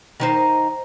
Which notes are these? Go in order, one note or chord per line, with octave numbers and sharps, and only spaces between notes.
D#3 D#4 C5